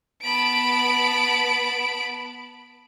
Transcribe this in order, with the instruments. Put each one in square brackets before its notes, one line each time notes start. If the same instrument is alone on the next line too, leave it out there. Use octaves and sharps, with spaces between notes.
[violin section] B3 A5 B5 D7